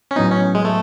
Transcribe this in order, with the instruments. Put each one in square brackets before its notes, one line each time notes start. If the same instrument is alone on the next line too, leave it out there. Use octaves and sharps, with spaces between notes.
[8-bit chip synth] C#4
[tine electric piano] A2 F#3 B3 [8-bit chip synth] D#4
[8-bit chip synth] C#4
G#3
A3